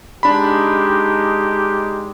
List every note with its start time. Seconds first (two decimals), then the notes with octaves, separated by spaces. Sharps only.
0.23 G#3 D4 D#4 G4 B5